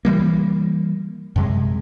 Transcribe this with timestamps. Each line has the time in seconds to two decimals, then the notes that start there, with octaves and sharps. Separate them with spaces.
0.05 E3 G3 A#3
1.36 F#2 C3 G#3